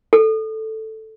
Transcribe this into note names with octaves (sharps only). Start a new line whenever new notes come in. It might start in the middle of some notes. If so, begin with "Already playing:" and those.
A4